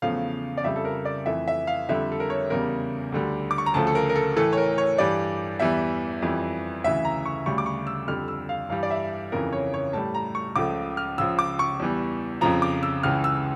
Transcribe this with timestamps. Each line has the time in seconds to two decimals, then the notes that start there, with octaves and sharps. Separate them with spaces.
0.02 E2 C#3 F3 A3 F5
0.57 D5
0.64 F2 C#3 G3 E5
0.76 A4
0.85 A#4
1.05 D5
1.26 F2 E3 A3 E5
1.48 E5
1.67 F5
1.89 F2 D3 G3 E5
2.12 A4
2.20 A#4
2.30 C#5
2.50 E2 C#3 G3 A#4
3.12 D2 D3 G3
3.51 D6
3.58 C#6
3.66 A#5
3.74 D2 C#3 F3 A3 A5
3.87 A4
3.95 A#4
4.09 A#4
4.16 A4
4.36 A2 E3 A3 A4
4.53 C#5
4.57 A#4
4.78 C#5
4.98 G2 E3 G3 D5
5.59 E2 E3 G3 E5
6.22 F2 E3 G3
6.84 D2 C#3 E3 E5
7.05 A#5
7.25 C#6
7.46 D2 C#3 G3 C#6
7.58 D6
7.66 C#6
7.87 E6
8.08 F2 D3 G3 F6
8.28 E6
8.49 F5
8.70 G2 E3 G3 F5
8.83 D5
8.90 E5
9.32 F2 C#3 E3 A#4
9.53 C#5
9.74 C#5
9.93 A2 G3 A5
10.14 A#5
10.35 C#6
10.56 C#2 C#3 F3 A3 D6
10.97 F6
11.18 C#2 C#3 F3 E6
11.39 D6
11.59 C#6
11.80 E2 E3 G3
12.41 F2 C#3 F3 A#5
12.62 D6
12.83 E6
13.03 C#2 C#3 E3 F6
13.24 E6